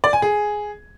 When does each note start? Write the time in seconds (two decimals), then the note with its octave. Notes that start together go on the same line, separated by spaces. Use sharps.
0.04 D5
0.13 G#5
0.22 G#4